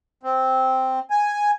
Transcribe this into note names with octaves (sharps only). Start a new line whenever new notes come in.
C4
G#5